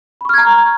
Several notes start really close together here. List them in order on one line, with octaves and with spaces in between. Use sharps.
B5 C#6 F6 G#6 A#5